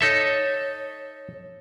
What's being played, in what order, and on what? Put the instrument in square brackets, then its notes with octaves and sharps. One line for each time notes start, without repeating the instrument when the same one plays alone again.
[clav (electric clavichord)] D#4 A4 E5 [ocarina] C#5